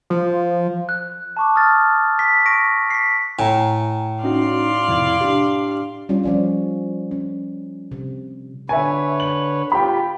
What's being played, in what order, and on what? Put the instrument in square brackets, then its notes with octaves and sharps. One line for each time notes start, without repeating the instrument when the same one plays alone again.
[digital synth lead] F3
[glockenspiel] F#6
A5 C#6 D6
D#6 F6 A6
B6
C#6 A#6 D7
B6 C7
[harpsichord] A2 [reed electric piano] G#5 A#5
[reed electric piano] C#4 D#4 F#4 [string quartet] D5 F5 C6
[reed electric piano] F2 C3 E4
D4 G4
[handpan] G3 C#4 F4 C#5
F3 C#4 D5
C#4
C3
[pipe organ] D3 B4 C#5 [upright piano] E5 G#5
[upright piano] F#7
[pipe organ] F4 G4 [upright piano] G5 B5